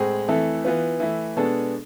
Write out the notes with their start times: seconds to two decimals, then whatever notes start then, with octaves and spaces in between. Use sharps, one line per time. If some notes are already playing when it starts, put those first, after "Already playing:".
Already playing: A2 G#3 C4 G#4
0.28 F2 E3 A3 E4 A4
0.65 E3 B3 F4 B4
1.00 E3 A3 E4
1.36 B2 G#3 B3 D4 A4